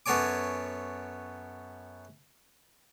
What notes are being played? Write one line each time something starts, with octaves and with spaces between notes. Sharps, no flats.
F#2 B3 A4 C#5 G#5 D6